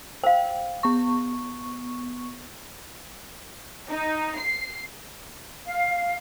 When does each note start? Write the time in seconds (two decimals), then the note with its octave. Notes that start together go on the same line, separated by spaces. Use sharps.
0.24 C5 F5 G5
0.83 B3 C#6
3.90 D#4
4.39 C7
5.66 F5